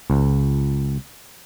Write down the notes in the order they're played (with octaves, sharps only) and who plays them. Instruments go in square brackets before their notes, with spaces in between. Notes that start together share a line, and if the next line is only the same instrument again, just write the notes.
[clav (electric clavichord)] C#2